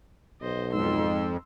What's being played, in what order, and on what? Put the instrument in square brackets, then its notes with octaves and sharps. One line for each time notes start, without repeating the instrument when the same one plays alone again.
[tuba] B1 [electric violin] C5 D#5
[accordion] F2 [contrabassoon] G#2 [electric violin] C6 E6